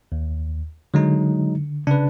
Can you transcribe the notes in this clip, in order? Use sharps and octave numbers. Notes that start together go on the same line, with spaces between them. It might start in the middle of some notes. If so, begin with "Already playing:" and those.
D#2
D3 F#3 G#3 D#4
C#3 D4 B4